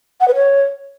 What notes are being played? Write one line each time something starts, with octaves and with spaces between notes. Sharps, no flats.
F#5
B4
C#5